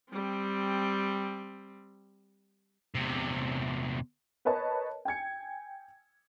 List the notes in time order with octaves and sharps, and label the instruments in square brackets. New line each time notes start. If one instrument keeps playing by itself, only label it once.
[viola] G3 C4
[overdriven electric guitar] E2 C3
[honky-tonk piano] A#4 B4 C#5 D#5 A5
G5 G#5 G#6 C#7